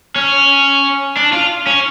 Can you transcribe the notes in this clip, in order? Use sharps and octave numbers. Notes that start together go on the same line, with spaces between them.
C#4
D4
F4
C#4